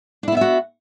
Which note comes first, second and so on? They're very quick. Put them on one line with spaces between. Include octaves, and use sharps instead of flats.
D4 E4 B3 E5 F#4